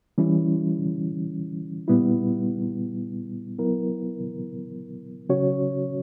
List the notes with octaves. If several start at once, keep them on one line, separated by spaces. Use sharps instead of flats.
E3 G3 C#4 E4
A#2 G3 B3 E4
F#3 B3 E4 A#4
C#3 F#3 C#4 F#4 C#5